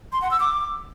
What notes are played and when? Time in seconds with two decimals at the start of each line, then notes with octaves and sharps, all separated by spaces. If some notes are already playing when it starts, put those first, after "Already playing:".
0.12 C6
0.22 F#5
0.31 E6
0.40 D6